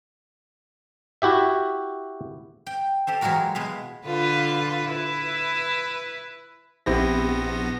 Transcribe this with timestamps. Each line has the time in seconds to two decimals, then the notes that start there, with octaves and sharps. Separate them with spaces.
1.22 E4 F#4 G4 E5
2.67 G5
3.07 G4 A4 C5
3.21 E3 F#3 G#3 F4 F#4 A#4
3.55 B2 G#3 B4 F5
4.05 D3 F4 B4
4.89 E4 B4
6.86 A#1 B3 C4 E4 G4 A#6